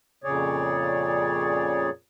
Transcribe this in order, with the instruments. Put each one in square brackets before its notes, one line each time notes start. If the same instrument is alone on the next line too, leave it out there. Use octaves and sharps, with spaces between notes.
[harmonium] F2 A#2 C#3 G#4 C#5 D5